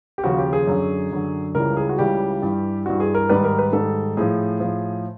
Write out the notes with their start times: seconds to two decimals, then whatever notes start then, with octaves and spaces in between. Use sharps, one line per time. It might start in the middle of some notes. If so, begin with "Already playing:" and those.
0.18 G4
0.24 D#2 C#3 F3 F#4
0.38 G4
0.53 G#4
0.67 F#2 D3 F#3
1.11 F#2 D3 F#3
1.55 C#2 C#3 E3 G3 A#4
1.77 G#4
1.89 F#4
1.98 C#2 C#3 E3 G3 G4
2.42 G2 E3 G3
2.85 G2 E3 G3 F#4
3.00 G#4
3.14 A#4
3.29 G#2 D#3 G3 B4
3.44 A#4
3.59 B4
3.73 G#2 D#3 G3 A4
4.17 A2 F3 G#4
4.60 A2 F3